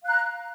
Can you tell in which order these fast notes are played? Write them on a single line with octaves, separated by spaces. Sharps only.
F5 F#6 A#5